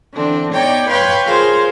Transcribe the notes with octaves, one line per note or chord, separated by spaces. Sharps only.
D3 E3 C4 D4
B3 D#4 C#5 D5 G5
B4 C#5 F5 G5 C6
F4 G#4 A#4 C5 C#5 F5